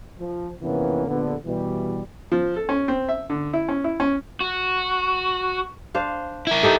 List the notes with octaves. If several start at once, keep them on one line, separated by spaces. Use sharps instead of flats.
F3
F2 C3 E3 A#3 B3 C#4
A#1 D3 B3
B2 E3 G3
F3
A4
C#4
C4
E5
D3
E4
C#4
E4
C#4
F#4
D4 C5 F5
E4 A#4
D#4 G4 A4